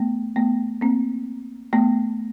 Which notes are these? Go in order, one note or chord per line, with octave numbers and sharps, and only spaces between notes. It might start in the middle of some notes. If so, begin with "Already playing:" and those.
Already playing: A3 B3
A3 B3
A#3 C4
A3 B3